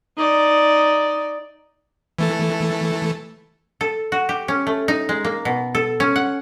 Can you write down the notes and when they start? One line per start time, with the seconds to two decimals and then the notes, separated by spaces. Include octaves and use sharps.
0.18 D#4 D5
2.19 E3 A3 A4
3.81 A4
4.12 F#4
4.29 G4
4.48 C#4
4.67 A3
4.88 D#4
5.09 G#3
5.25 A#3
5.45 B2
5.75 A4
6.00 C#4
6.16 F#5